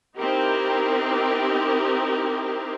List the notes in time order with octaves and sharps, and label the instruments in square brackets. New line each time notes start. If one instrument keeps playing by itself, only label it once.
[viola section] C4 D#4 E4 G4 A#4